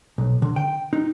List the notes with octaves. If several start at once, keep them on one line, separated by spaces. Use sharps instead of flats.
B1
D3
G5
D#4